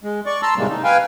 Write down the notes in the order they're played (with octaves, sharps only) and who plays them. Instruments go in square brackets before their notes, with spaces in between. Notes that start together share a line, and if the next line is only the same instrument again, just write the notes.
[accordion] G#3
D5 C#6
A5 A#5 C6 E6
A2 C3 D#3 G3 G#3 A#3
D#4
B4 F5 G5 G#5